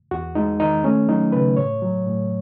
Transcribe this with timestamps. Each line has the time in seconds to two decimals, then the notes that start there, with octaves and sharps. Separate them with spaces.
0.11 E2 F#4
0.35 G#3 D#4
0.60 D#3 D#4
0.84 A3 C#4
1.08 F#3 D#4
1.32 C#3 B4
1.57 A2 C#5
1.82 F#3
2.06 A2